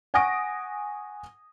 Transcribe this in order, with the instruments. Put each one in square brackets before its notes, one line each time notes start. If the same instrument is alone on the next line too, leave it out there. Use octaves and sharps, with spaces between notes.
[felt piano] F#5 G#5 C#6 D#6 A#6 D7